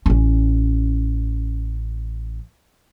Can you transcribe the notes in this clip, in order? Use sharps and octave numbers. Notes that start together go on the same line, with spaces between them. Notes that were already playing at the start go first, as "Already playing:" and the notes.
A1 C#4